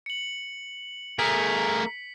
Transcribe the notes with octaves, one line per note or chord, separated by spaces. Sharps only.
C#7 F#7
A3 G#4 A#4 B6